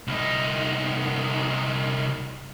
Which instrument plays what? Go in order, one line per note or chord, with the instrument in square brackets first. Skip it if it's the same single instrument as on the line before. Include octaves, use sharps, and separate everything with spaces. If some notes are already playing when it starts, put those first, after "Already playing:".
[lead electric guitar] C2 D#4